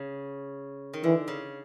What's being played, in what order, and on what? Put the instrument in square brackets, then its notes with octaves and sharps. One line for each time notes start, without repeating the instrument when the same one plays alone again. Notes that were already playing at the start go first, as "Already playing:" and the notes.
Already playing: [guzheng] C#3
D#3
[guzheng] D3 [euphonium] E3
[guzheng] C#3